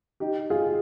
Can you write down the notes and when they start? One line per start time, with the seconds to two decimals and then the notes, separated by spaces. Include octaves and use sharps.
0.20 D#4 G4
0.50 F4 G#4